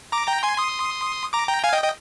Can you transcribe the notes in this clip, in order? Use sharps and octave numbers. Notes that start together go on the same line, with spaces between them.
A#5 D6
G5 A#5
G#5 C6
C6 D#6
A#5 D6
G5 A#5
F5 G#5
D#5 G5
D#5 G5